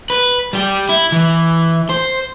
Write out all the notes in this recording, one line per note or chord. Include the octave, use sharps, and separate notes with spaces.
B4
G3 G4
E4
E3
C5